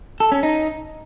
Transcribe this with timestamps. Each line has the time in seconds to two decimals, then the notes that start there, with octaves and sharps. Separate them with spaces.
0.20 A4
0.32 C#4
0.43 D#4